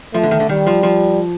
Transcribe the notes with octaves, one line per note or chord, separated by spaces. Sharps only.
F3 A3
D3
D#3
D3
D#3 G3
F3
F3